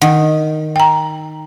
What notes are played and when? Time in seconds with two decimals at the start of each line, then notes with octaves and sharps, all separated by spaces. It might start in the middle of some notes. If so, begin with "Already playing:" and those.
0.02 D#3 F#5
0.76 G5 A#5